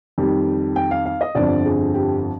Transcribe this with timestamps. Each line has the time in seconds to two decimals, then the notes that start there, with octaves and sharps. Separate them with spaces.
0.18 F2 D#3 G3
0.76 G5
0.91 F5
1.06 F5
1.21 D#5
1.35 G1 F2 D3 F3 D5
1.65 G#4
1.94 G4